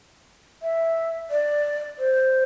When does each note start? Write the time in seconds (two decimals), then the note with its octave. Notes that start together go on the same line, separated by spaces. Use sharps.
0.63 E5
1.31 D5
1.99 C5